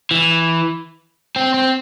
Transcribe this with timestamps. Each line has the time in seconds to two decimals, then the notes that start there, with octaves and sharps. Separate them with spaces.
0.11 E3
1.36 C4
1.54 C4